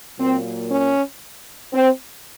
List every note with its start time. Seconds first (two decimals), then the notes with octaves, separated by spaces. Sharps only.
0.19 A#2 F#3 A#3 C4
0.70 C#4
1.73 C4